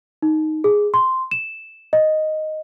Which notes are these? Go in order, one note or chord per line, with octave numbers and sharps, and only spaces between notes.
D#4
G#4
C6
E7
D#5